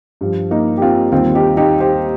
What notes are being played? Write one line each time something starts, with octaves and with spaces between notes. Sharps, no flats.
G2 F3
A#3 D#4
G4
C4 F4
D#2 D#3 G3 C4 F4
D#4 G4
D#4 G4
G4 C5